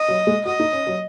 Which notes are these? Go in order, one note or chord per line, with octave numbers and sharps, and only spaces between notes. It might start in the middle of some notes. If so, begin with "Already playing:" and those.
Already playing: D#5
F#3
G#3
F#4 D#5
D#4
C#4
F#3